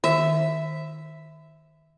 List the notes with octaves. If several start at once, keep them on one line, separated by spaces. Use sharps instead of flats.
D#3 E5